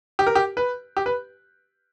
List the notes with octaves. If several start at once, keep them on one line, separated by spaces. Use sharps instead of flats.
G4
A#4
G4
B4
G4
B4